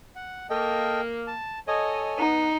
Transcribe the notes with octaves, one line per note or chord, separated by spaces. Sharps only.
F#5
A#3 A4 D#5 G5
A5
A4 C#5 D#5 G#5
B3 D#4